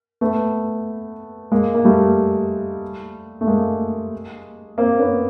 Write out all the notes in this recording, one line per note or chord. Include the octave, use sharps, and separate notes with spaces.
A3 B3
G#3 A#3
A#3
G3 A3
A3
G#3 A#3
A#3 C4
B3 C#4